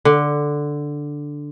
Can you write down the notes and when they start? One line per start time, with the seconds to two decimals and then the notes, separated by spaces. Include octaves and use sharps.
0.05 D3